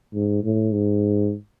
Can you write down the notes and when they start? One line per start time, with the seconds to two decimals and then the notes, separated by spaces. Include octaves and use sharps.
0.14 G#2
0.44 A2
0.72 G#2